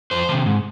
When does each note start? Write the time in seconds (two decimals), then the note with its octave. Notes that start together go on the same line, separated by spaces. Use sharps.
0.11 F2 C5
0.29 C3 D#3
0.46 G#2